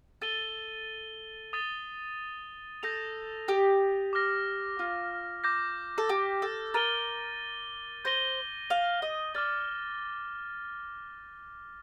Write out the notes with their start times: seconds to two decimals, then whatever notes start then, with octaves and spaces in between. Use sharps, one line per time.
0.22 A4 A6 D#7 G7
1.53 D#6 A6 D#7 G7
2.83 A4 G6 A#6 F7
3.48 G4
4.13 D6 F6 A#6
4.79 F4
5.44 D6 G6 A#6
5.98 A4
6.09 G4
6.42 A4
6.74 A#4 A6 D#7 G7
8.05 C5 G6 A#6 D#7 G7
8.70 F5
9.02 D#5
9.34 D5 D6 F6 A6